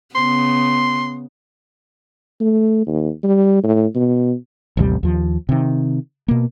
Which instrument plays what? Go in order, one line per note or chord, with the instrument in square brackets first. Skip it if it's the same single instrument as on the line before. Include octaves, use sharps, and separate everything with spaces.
[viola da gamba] C#3 B3 [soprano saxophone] C6
[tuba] A3
D#2
G3
A2
B2
[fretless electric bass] A1 D#2 C3 G3
D#2 F3
C3 D#3
B2 A#3